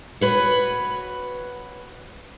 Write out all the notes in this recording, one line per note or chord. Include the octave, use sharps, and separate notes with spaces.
F#4 B4 C#5